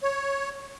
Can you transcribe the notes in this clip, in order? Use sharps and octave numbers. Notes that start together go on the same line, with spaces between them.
C#5